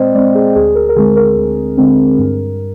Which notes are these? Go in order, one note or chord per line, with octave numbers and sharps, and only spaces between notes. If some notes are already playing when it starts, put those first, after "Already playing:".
Already playing: A#2 G#3 C4 C5 D5 D#5 G5
G#3 C4 D5
G#4
D2 G#4
A#4
A#4
D3 G#3 C4 G#4
A#4
D2
D3 G#3 C4
G2